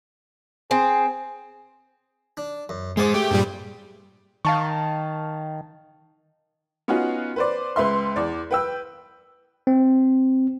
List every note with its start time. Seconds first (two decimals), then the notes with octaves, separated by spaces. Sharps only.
0.71 C4 G#4
2.37 D4
2.69 F#2
2.97 G#3 G#4 B4 C5 A5 D6
3.14 A3 G4
3.31 G2 A#2 G3
4.45 D#3 F5 A5 C#6
6.88 B3 C#4 D#4 F4 F#4
7.36 B4 C5 D5
7.76 C#2 B4 E5 C6
8.16 E2 D5
8.51 B4 G5 E6
9.67 C4